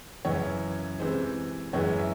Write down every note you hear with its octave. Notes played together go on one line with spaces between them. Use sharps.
F#2 C#3 E3 C#5
C3 E3 G#3 C5
F#2 E3 G#3 C#5
E5